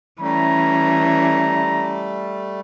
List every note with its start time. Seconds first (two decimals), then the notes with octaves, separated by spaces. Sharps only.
0.21 E3 G3 A3 C#4 A#5